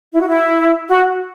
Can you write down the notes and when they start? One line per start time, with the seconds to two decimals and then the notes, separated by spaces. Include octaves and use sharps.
0.14 E4
0.21 F#4
0.28 E4
0.88 F#4